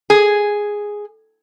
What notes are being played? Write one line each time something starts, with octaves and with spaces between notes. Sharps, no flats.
G#4